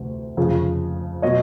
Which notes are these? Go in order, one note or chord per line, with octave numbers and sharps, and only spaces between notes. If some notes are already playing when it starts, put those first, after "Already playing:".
Already playing: D2 C3 E3
F1 F2 C#3 F3
B2 F#3 C#5 D#5